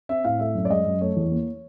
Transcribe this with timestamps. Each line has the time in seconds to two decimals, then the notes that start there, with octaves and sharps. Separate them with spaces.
0.09 C4 E5
0.24 A2 F5
0.40 A3 E5
0.55 F#2
0.65 D5
0.70 G#3 D#5
0.86 F#2
1.01 A3 C#5
1.16 E2
1.31 A#3